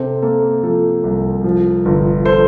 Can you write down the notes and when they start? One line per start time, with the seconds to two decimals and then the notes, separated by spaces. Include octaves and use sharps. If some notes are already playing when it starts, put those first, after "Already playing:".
Already playing: C3 A4 C5
0.22 A#3 A4
0.63 F3 A4
1.03 C2
1.44 F3
1.85 G1
2.26 A4 C5